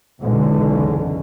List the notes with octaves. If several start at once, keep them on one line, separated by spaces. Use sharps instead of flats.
F#1 B1 E2 D3 G#3 C#4